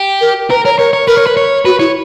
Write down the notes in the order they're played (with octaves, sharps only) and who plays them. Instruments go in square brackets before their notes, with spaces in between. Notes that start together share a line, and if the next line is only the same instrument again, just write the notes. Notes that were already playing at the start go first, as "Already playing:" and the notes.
Already playing: [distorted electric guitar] G4
[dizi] A#4
[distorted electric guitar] A#4 [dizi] B4
[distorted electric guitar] A#4 [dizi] C#5
[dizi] A#4 [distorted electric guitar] C#5
[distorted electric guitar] C#5
[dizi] A#4 [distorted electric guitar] B4
[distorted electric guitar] C#5
B4
C#5
[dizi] F#4 [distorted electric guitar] B4
[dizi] E4 [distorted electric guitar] C#5